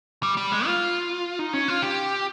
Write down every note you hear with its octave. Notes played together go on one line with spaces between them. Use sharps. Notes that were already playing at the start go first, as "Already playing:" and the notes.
G3
G3
G#3
F4
D#4
C#4
F4
G4